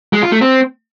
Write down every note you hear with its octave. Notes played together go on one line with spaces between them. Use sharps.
G#3
F4
A3
C4